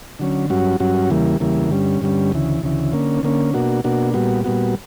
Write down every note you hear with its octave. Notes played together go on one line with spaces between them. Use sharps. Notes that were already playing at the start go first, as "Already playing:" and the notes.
D3 F#3 C#4
G2 F#3 C#4 F#4
G2 F#3 C#4 F#4
E2 C#3 E3 G3 A#3
E2 C#3 E3 G3 A#3
G2 D3 G3 C#4
G2 D3 G3 C#4
D2 C#3 E3
D2 C#3 E3
D3 A#3 C#4
D3 A#3 C#4
B2 A#3 D4 F#4
B2 A#3 D4 F#4
A#2 G3 B3 F#4
A#2 G3 B3 F#4